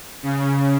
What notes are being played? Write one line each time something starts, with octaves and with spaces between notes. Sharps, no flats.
C#3